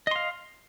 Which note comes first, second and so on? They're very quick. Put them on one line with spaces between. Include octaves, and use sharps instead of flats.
D#5 C6 F5